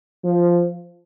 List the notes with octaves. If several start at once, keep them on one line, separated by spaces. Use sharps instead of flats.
F3